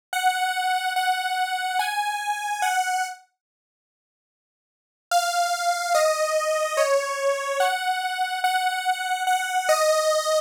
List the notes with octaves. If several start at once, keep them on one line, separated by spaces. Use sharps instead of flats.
F#5
F#5
G#5
F#5
F5
D#5
C#5
F#5
F#5
F#5
D#5